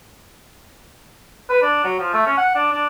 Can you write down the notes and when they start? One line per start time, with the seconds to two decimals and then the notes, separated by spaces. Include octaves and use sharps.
1.50 B4
1.62 D4
1.84 F#3
1.99 F3
2.13 A3
2.26 C#4
2.37 F#5
2.55 D4
2.72 D4